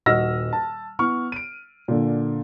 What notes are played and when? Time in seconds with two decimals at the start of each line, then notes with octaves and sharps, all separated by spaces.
0.06 D#1 F#4 D#5 E6 F6 A#6
0.53 A5
0.99 B3 E4 C#6 F6
1.32 D7 D#7
1.88 A#2 D3